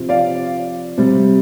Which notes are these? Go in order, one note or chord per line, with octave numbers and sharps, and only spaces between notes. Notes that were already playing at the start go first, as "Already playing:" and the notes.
Already playing: C3 F3
D5 F5
C3 G3